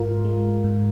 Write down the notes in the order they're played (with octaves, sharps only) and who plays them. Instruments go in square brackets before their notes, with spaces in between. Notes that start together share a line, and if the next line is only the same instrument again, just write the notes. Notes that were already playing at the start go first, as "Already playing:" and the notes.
Already playing: [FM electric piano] G#2 F4 A#4
G#3
G#2